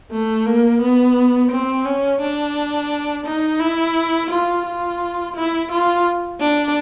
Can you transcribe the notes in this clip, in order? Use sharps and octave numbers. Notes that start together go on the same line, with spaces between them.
A3
A#3
B3
C4
C#4
D4
D#4
E4
F4
F4
E4
F4
D4